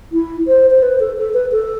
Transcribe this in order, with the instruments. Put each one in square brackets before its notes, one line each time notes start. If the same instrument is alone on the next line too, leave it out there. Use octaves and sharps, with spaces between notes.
[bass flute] E4
C5
C5
B4
A4
A4
B4
A4